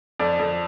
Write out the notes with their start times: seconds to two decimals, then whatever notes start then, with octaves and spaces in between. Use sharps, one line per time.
0.19 F2 D5
0.39 F2